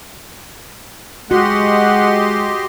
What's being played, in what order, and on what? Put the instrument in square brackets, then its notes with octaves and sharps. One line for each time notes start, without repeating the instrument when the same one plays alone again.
[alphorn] G#3 [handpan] F#4 [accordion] G4 D#5 C6 [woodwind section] F#5